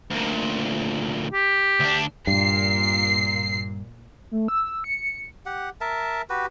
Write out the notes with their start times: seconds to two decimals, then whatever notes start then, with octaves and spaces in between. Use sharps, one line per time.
0.11 D2 A#2
1.32 G4
1.80 D2 D4
2.27 G2 A#2 C7
4.31 A3
4.48 E6
4.84 C#7
5.46 G4 F#5
5.81 A#4 E5 A5
6.30 F#4 G4 B4